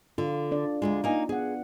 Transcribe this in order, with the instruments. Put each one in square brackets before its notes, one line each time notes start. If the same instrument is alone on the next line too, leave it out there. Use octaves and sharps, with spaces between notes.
[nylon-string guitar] D3 [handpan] F4
[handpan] D4 D5
[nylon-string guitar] D2 G#2 G#3 [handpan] F4
[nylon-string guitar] A#3 D#4 G#5
[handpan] B3 F#5 [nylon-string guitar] G#4